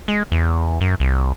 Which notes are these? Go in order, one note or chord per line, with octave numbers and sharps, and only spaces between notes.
G#3
E2
F#2
C2